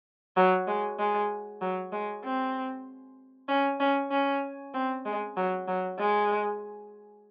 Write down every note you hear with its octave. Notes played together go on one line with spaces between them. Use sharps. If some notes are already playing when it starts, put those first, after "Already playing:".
F#3
G#3
G#3
F#3
G#3
C4
C#4
C#4
C#4
C4
G#3
F#3
F#3
G#3